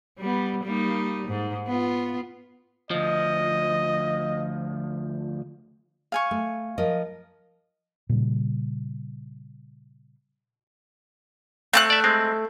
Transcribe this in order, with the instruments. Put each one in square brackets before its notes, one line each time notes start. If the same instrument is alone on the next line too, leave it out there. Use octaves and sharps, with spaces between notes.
[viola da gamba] G3 B3
G3 A#3 D#4
G#2
B3 F4
[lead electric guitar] D2 F3 [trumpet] D#5
[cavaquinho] F5 G#5 C#6
[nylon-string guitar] A3
F3 A#4 D#5
[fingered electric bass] A#2 C#3 G3
[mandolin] A3 G5 F#6 [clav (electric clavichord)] C4
[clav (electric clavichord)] D5 E5
G#3 C4